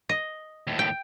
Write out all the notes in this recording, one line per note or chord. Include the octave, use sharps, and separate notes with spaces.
D#5
D#2 A2
G5